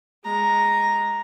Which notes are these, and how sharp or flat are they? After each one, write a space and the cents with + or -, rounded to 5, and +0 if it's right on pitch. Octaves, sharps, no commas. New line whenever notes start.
G#3 -10 A#5 +0